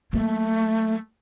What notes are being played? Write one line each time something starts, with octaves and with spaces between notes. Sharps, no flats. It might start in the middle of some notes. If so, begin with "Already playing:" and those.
F#3 A3 A#3